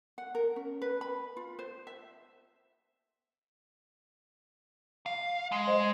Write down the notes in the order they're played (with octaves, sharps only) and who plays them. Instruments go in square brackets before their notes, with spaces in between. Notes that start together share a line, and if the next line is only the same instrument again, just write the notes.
[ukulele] F#5
A#4
C#4
B4
B5
F4
C5
E5
[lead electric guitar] F5
G#3
[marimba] C5 D#5